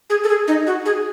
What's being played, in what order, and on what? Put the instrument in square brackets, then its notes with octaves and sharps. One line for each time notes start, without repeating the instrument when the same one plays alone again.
[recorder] G#4
A4
G#4
D#4
F#4
G#4